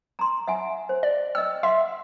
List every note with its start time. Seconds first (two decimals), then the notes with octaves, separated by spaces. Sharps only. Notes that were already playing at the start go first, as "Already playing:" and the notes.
0.19 A#5 C6
0.48 E5 F#5 G#5
0.89 C5
1.03 D5
1.35 D#5 G5 E6
1.63 E5 F#5 C6